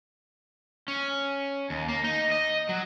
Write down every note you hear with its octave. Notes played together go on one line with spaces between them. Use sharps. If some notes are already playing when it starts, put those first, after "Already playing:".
C#4
D#2
A#3
D#4
D#5
F#3